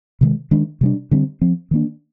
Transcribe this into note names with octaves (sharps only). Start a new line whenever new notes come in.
C3 D#3 G#3
D#3 G#3 D4
C3 G3 D4
D3 G3 C4
F3 C4
D#3 A#3 D4